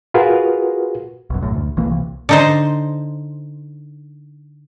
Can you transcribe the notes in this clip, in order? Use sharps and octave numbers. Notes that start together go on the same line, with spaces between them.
F4 F#4 G#4 A#4 B4
B1 F#2
B1 F#2 A2
D2
B1 E3 A#3
C2
D3 D#4 C5